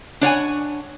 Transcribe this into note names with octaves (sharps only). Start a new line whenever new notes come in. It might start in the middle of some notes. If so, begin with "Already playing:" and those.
D4 C#5 F#5 G#5